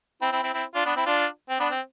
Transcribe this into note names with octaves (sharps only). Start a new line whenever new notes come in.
C4 E4
C4 E4
C4 E4
C4 E4
D4 F4
B3 D4
C4 E4
D4 F4
C4
B3 D4
C4